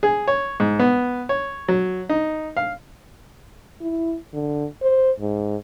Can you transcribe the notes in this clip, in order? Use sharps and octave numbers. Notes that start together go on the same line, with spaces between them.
G#4
C#5
G#2
B3
C#5
F#3
D#4
F5
E4
D3
C5
G#2